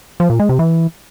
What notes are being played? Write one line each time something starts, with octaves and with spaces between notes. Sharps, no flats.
F3
A#2
G#3
C3
E3